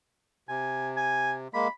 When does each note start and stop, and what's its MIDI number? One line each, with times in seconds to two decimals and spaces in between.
0.49 1.48 48
0.49 0.90 80
0.97 1.33 80
1.54 1.68 56
1.54 1.68 58
1.54 1.70 83